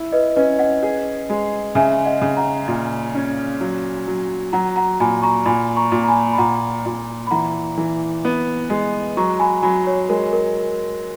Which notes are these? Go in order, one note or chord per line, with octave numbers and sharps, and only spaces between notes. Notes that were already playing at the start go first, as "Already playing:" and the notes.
Already playing: E4
B4 D#5
C#4 B4 D#5
D#5 F#5
G#4
G#3
C#3 E5 G#5
D#5 F#5
C#3
F#5 A#5
A#2
C#4
F#3
F#3
F#3 F#5 A#5
F#5 A#5
A#2 G#5 B5
A#5 C#6
A#2 G#5 B5
A#5 C#6
A#2
A#5
G#5 B5
B5
A#2 F#5 A#5
A#2
B5
E3 F#5 A#5
E3
B3
G#3
F#3 A#5 C#6
G#5 B5
F#3 G#5 B5
C#5
G#3 A#4
A#4